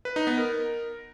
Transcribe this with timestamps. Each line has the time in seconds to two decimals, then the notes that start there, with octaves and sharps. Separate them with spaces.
0.05 B4
0.16 D#4
0.27 B3
0.38 A#4